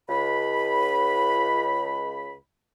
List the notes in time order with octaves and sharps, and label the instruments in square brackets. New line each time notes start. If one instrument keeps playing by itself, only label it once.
[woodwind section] C#2 B5